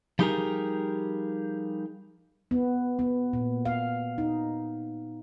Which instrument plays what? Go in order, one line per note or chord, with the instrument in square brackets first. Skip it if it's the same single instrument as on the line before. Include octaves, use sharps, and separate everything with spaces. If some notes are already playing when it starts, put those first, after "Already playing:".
[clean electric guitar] F3 G3 D#4 G4 G#4 A#4
[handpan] B3
B3
A#2
F5
D#4